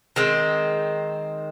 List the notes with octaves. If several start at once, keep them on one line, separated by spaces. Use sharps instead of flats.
D#3 G#3 C4